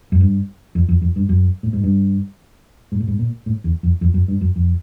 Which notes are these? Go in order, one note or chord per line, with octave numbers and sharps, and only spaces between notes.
F#2
G2
F2
F2
F2
G2
F#2
A2
G#2
G2
G#2
A2
G#2
A#2
A2
E2
F2
F2
F#2
G2
F#2
F2